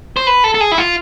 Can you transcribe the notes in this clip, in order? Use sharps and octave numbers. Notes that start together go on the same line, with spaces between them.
C5
B4
A4
A4
G#4
E4
F4